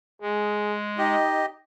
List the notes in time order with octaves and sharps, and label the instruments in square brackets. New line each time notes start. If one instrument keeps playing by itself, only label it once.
[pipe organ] G#3 [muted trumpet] G#4
[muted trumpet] D#4 [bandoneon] G4 D#5